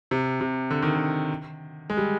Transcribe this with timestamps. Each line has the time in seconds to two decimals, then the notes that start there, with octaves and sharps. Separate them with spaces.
0.11 C3
0.41 C3
0.70 D3
0.82 D#3
0.95 D3
1.90 G#3
1.97 G3